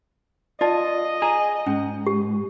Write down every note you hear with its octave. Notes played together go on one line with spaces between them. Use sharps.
F4 D5 D#5 A5
G#4 G#5 A#5
G#2 C#4
G4